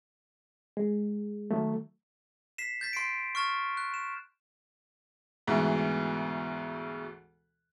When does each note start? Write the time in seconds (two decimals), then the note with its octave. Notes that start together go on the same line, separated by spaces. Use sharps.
0.77 G#3
1.51 D#3 F#3 A3
2.58 B6 C7 E7
2.81 G6 A6 B6
2.93 C6 C7 D7
3.35 C#6 F6 A6 E7
3.77 F#6
3.94 E7
5.47 D2 G#2 B2 E3